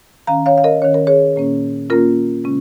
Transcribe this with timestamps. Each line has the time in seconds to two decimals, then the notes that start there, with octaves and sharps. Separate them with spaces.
0.27 D#3 C#4 F5 A#5
0.46 C#5 F5
0.58 F5
0.64 A#4 D#5
0.82 D#3 C#4 C#5
0.94 A#4
1.07 G#4 C#5
1.36 A#2 A#3 C#4
1.90 A#2 A#3 C#4 F4 A#4
2.44 C#3 G#3 C#4